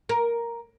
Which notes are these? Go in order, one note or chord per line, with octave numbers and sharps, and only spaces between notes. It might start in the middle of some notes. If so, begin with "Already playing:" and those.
A#4